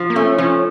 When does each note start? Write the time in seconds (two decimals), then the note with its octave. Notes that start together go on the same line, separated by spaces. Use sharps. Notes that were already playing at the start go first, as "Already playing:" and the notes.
Already playing: F3
0.10 A#3
0.16 A3 C#4
0.38 F3 C#4